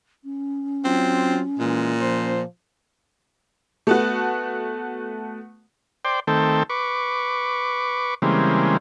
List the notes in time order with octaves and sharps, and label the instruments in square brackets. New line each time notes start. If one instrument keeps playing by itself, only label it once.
[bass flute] C#4
[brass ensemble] F#3 F4 [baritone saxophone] C4
[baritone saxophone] A#2 [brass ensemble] E3 G#3
[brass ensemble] F3 C5
[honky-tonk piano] A3 B3 F#4
[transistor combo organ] C5 D5 G5
D#3 A3 C4 A4 G5
B4 C#6 D6
C#3 E3 G3 G#3 A#3 C4